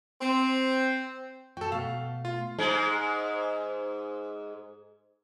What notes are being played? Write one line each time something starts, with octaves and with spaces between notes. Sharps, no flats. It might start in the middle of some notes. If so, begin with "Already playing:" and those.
C4
F#4 A4 G5 A5
B2 A3 F5
F4
G#2 G#3